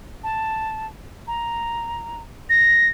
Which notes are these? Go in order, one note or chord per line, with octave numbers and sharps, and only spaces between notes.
A5
A#5
A#6